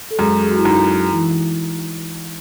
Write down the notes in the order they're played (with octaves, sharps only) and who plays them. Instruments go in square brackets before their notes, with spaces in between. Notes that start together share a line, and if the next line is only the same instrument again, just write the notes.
[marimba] A4
[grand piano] F#2 [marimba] G#3 G#4
[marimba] G#4
F#4
E4
[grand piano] F#2 [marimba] D#4
[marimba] E3 E4